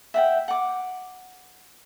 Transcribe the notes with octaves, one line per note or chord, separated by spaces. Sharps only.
E5 F#5 G5
F#5 D6